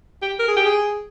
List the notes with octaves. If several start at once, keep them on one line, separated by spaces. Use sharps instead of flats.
G4
A#4
G#4
G4
G#4